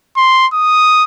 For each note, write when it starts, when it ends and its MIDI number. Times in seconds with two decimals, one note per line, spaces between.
0.17 0.47 84
0.53 1.04 87